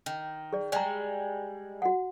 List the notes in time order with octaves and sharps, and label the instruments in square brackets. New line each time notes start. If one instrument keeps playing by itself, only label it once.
[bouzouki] D#3
[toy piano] G#4 D5
[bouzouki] G3 G#3 [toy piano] D5 A#5
[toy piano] F#4 F#5